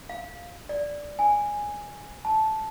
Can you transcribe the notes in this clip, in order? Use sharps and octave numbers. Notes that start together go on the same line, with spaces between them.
F5
D5
G#5
A5